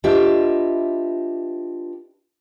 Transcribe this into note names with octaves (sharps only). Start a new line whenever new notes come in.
D4 F4 G4 B4 D#5 E5